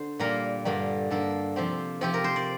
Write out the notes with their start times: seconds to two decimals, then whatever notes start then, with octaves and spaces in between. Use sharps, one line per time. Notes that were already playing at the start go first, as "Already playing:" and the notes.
Already playing: D3 C5
0.19 A#2 G3 A#3 A#4
0.65 G2 D3 G3 A#3
1.10 G2 D3 G3 A#3 A4
1.56 C3 F3 C4 G4
2.01 C3 F3 C4 G4
2.14 A#4
2.24 C5
2.36 D5